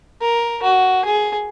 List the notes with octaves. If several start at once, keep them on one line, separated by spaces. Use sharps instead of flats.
A#4
F#4
G#4